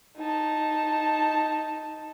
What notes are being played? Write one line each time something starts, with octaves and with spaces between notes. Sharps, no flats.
D#4 A5